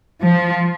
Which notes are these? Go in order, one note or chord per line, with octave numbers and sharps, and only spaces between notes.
F3